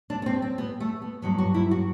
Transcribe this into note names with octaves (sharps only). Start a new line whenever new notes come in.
D4
B3
C4
C4
B3
A3
B3
G2 F#3 B3
F#4
E4
F#4